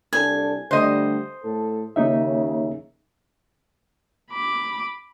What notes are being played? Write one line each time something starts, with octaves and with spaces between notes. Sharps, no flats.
C2 D4 A4 G#5
D3 G3 A3 C5 D#5
A2 A4
D#2 C#3 A#3 D#4 E5
B5 D6